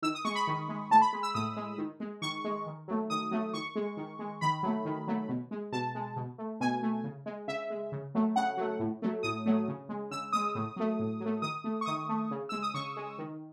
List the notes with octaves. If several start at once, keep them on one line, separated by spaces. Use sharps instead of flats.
D#3 E6
D#6
G#3 C#6
B5
D#3
G#3
A2 A5
B5
G#3
E6
A2 D#6
G#3
D#3
G#3
D#3 C#6
G#3
D#3
F#3 A3
D#3 D#6
F#3 A3
D#3 C#6
G#3
D#3
G#3
D#3 B5
F#3 A3
D#3
F#3 A3
B2
G#3
B2 A5
G#3
B2
A3
B2 G#5
A3
C#3
G#3
C#3 E5
G#3
C#3
F#3 A3
C#3 F#5
F#3 A3
A2
F#3 A3
A2 D#6
F#3 A3
C#3
G#3
C#3 E6
G#3 D#6
A2
F#3 A3
A2
F#3
A3
D#3 D#6
A3
C#6
D#3 D#6
A3
C#3
G#3 E6
D#6
C#3 C#6
G#3
D#3